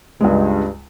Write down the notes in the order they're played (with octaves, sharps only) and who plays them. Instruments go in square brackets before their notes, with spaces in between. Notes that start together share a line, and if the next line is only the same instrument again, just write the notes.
[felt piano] C#2 G#3 [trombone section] G2